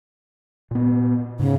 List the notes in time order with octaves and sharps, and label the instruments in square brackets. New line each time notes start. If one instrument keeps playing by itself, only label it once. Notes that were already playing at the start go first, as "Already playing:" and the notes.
[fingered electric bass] A#2 B3
[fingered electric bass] G#2 [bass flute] C#3